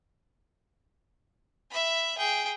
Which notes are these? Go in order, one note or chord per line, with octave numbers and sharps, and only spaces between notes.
E5 B5
G#4 G5